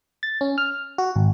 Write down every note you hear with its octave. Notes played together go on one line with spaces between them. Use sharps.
A6
C#4
F6
F#4
G#1